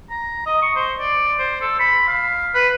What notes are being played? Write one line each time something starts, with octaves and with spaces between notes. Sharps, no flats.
A#5
D#5
C#6
C5
D5
C5
A4
B5
F5
B4